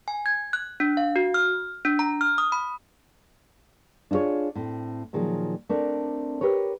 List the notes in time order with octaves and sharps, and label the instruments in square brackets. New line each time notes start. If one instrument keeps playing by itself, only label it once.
[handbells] G#5
G#6
F#6
D4
F5
F#4
F6
D4
A#5
F6
D#6
B5
[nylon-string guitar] D4 E4 F4 G#4 C#5
A2 C4
A#2 D#3 F3 F#3 G#4
A3 C4 D4 A#4 D5
G4 A#4 B4 C#5